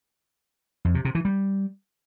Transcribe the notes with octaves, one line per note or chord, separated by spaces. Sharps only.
F2
C3
C3
E3
G3